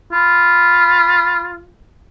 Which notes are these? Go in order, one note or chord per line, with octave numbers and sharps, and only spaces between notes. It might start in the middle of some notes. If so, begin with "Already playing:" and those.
F4 B5